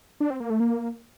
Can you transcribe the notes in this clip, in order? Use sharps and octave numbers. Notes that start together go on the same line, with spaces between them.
D4
C4
A#3
A3
A#3